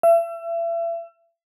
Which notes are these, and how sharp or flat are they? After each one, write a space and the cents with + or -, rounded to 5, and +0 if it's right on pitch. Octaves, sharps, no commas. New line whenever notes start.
E5 +35